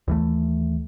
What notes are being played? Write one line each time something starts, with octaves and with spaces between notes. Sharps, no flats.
D#2 E3 A3